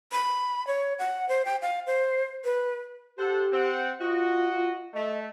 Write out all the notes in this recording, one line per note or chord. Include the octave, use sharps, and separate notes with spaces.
B5
C#5
F#5
C5
G5
F5
C5
B4
G4 A4 C5 F#5
C4 F#5
F4 F#4 D#5
A3 D#5